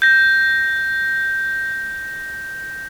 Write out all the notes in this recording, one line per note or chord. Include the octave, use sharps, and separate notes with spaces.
G6 A#6